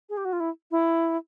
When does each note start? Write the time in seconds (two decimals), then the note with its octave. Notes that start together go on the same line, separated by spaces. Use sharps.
0.09 G#4
0.17 G4
0.25 F#4
0.33 F4
0.40 E4
0.71 E4